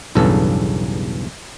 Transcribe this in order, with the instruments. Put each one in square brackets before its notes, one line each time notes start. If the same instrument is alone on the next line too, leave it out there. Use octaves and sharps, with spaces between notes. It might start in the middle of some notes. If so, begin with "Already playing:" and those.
[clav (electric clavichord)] B1 E2 G2 C#3 A4